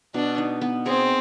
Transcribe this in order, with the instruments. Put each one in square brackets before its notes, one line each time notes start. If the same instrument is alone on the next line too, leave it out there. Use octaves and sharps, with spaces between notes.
[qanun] B2 [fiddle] D4
[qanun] D#4
B3
[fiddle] C4 [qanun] G#4